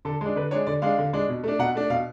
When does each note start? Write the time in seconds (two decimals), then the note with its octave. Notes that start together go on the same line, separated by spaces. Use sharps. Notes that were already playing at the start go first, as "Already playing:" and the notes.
0.05 D3 A4
0.21 G#3 D4
0.36 D3 B4
0.51 G#3 D4 C#5
0.67 D3 D5
0.82 G#3 D4 F5
0.98 D3
1.13 G#3 D4
1.29 B2
1.44 A3 D4
1.59 B2 F#5
1.75 A3 D4
1.90 B2 F5